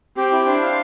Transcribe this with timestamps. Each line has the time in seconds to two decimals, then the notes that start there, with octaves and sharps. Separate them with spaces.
0.17 C4 G4
0.32 E4
0.47 D4 C5
0.62 F5